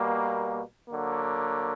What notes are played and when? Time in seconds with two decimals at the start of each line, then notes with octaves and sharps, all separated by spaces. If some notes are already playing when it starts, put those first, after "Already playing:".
Already playing: B2 G3 A#3
0.88 D3 F#3 A#3